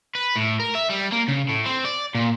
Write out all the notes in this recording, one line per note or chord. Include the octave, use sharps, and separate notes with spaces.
B4
A2
A#4
E5
G3
A#3
C#3
A2
C4
D5
A#2